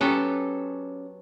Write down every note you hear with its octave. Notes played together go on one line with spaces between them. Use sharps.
F#3 B3 C#4 G4 A4